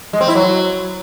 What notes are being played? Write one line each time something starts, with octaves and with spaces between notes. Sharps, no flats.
G#3
C4
E4
F#3